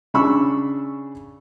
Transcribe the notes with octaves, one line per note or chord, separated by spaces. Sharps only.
C#3 D4 B5 C#6 E6